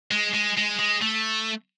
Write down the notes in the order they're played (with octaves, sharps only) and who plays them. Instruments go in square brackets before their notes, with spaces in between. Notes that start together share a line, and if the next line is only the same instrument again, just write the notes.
[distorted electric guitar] G#3
G#3
G#3
G#3
A3